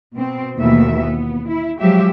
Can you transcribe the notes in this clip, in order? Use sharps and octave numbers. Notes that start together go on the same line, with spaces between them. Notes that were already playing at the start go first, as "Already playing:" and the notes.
B2 C4
D#2 B2 E3 A3 E5
B3
E4
F3 F#3 G#3 G4 E5